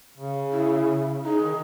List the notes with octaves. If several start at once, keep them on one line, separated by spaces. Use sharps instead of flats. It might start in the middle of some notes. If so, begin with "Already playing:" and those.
C#3
E4
D#4 G#4
D#3